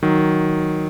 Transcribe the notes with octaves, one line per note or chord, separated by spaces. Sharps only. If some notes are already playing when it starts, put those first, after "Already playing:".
D#3 F#3